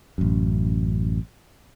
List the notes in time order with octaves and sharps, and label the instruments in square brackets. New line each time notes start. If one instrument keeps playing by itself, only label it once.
[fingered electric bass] A1 F#2